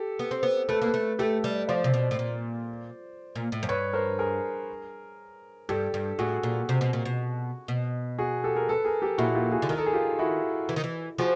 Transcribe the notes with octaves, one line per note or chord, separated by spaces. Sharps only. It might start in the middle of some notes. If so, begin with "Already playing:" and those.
Already playing: G4 A4
B3
C4
B3
A3 A4 B4
A#3 A4 B4
A3
A3 G4 A4
G3
F3 C5 D5
C3
B2
A2
A#2
A#2
A2
F#2
G2 B4 C#5
A#4 C5
G#4 A#4
G2 G4 A4
G2
A2 F#4 G#4
A#2
C3
B2
A#2
B2
B2
F#4 G#4
G4 A4
G#4 A#4
A4 B4
G#4 A#4
G4 A4
A#2 E4 F#4
F4 G4
F#4 G#4
D3
D#3 A#4
A4
G#4
F4 G4
E4 F#4
E3
D#3
E3
F3 F#4 G#4